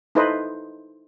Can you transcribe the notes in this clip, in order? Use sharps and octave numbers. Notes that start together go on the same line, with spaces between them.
D#4 E4 A4 B4 C5 D#5